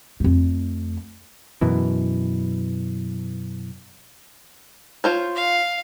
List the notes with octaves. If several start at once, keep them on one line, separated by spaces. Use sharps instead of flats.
F2 A3
F#2 B2 E3
F4 C5 C#5
F5